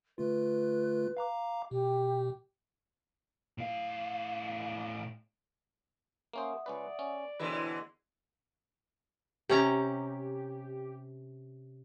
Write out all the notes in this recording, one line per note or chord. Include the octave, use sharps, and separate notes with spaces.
D3 A3 F4 B4
F5 A#5 D6
B2 G4
A2 F5
A#3 C#4 C5 E5 F#5 D#6
C#2 C#4 B4 D5
C#4
B2 D3 E3 G#3 C4 E4 B4 C#5
C3 C#4 G4 A#5